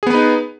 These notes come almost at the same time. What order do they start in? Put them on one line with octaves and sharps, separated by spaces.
G#4 B3 B4 D#4